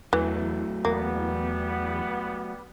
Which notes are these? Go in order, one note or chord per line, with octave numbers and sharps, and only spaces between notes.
E2 E3 F#3 A3
E2 G3 A#3 B3